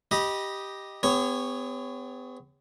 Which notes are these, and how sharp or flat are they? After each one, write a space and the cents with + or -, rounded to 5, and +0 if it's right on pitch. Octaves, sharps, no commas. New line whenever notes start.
G4 +0 D#5 +0 B5 -25
B3 +40 G#4 -40 C#5 +0